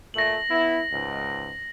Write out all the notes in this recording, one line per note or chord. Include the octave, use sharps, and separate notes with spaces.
A#2 A3 A#6 F#7
B3 E4
C#2 G#2